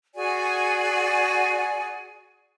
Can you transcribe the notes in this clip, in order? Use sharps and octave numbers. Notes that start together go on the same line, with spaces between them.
F#4 G#4 D5 G#5